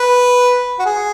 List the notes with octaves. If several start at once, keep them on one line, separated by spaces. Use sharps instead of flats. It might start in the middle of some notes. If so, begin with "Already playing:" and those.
Already playing: B4
F#4
G#4